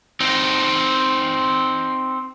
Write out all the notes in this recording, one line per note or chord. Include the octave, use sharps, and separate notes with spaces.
C4 D#4